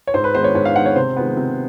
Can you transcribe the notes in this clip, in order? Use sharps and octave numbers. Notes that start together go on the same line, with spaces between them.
C#5
G#2 C5
B4
D#3 G#3 B3 C5
C#5
G#2 C#5
F5
D#3 G#3 B3 F#5
C#5
C3 C5
D#3 G#3 B3
C3